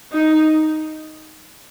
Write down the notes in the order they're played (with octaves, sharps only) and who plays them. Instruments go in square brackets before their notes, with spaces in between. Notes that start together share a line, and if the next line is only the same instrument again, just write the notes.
[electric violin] D#4